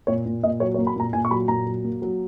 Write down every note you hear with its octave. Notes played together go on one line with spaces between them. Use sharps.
A#2 C#5
A#2
A#2 D#5
F#3 C#5
C#5
A#3
B5
A#2 A#5
A#2 G#5
C#6
F#3 B5
A#2 A#5
F#3
A#3
F#3